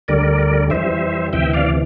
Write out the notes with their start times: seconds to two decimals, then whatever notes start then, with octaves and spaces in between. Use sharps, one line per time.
0.08 D2 D3 G3 A#4 D5
0.70 F2 E3 G3 C5 E5
1.33 D2 C3 E3 E5 G5
1.53 D5 F5